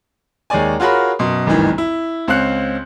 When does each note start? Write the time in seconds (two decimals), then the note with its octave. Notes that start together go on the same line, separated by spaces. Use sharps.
0.50 D#2 G#3 C#5 D5 G#5
0.80 F4 F#4 G#4 A#4 C#5 B5
1.19 F#2 B2 C6
1.47 G#1 D2 G2 D#3 E3
1.78 E4
2.28 C#2 C4 C#4 F5 F#6 C#7